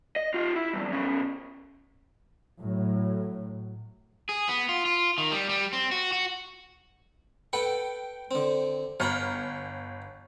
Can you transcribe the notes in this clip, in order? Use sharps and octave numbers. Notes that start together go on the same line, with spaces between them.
D#5
F4 G4
E4
E2 G2
B2 C#4
A2 F#3
G#4
B3
F4
F4
D#3
G3
G3
C4
F#4
F#4
A4 B4 F#5 G5
D3 C4
G1 C#5 A#5 B5 F6